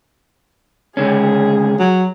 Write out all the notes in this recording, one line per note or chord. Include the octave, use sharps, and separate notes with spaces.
C#2 D3 C#4 G#4
F#3